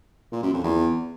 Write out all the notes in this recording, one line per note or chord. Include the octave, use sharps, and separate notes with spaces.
A#2
F#2
F2
E2